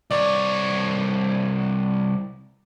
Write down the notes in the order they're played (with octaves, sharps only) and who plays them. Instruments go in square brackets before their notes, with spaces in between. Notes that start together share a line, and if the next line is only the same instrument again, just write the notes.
[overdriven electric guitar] C2 C#5 [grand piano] D5